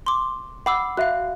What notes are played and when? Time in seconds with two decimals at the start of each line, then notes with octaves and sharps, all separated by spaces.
0.06 C6 D6
0.66 F#5 B5 D6 E6
0.97 F#4 E5 F5 F#6